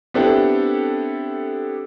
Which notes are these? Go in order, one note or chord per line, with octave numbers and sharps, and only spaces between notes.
B3 C4 D4 E4 G4 A4